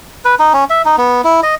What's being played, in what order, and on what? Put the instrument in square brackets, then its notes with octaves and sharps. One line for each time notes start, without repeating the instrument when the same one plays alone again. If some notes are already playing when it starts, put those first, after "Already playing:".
[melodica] B4
D#4
C#4
E5
D#4
B3
E4
D#5